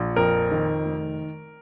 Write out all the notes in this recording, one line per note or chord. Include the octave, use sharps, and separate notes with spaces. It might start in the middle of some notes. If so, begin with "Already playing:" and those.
Already playing: A#1
F2 A#4
D#3
F1